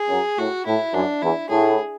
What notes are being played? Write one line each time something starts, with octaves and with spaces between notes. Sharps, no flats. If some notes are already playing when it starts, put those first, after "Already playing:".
Already playing: G#4
F#2
A2 F#4
A2 E4
F#2 D4
E2 E4
A2 G#4